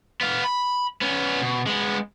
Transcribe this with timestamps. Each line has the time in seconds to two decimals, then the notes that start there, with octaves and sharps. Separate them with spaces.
0.21 B3 F5
0.44 B5
1.01 B3 C#4
1.41 B2
1.67 G#3 B3